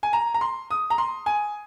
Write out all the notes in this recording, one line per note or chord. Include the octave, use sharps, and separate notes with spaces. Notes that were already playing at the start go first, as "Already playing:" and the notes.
G#5
A#5
A#5
C6
D#6
A#5
C6
G#5